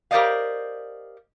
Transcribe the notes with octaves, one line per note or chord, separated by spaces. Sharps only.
G4 A#4 C5 D5 D#5 F5